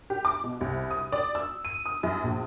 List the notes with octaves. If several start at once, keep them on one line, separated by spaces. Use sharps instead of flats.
G4
D6
B2
C2
D#6
D5
E6
D#7
D#6
F#2
A#1